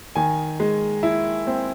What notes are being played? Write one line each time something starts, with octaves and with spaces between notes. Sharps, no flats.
D#3 G#5
G#3
E4
C4